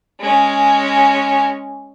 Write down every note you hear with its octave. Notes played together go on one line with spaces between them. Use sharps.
G#3 C#4